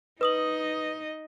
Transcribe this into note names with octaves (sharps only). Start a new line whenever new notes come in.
D#4 B4 D#5 D#6 F#7